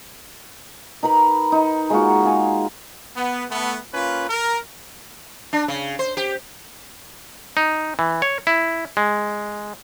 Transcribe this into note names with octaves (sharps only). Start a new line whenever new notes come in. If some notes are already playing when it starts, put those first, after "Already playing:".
D#4 A#4 B4 B5
D#4
G#3 A#3 F4 F#4
G#4 F5 G#5
B3
A3 B3
A#3 C#4 F4 B4
A#4
D4
C#3
C5
G4
D#4
E3
C#5
E4
G#3